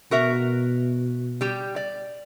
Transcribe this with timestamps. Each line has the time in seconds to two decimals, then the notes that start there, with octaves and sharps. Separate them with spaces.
0.11 B2 F#4 A#4 E5
1.41 G3 G4
1.76 D5